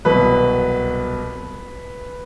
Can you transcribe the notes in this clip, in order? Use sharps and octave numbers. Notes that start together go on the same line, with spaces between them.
C2 B2 F#3 B4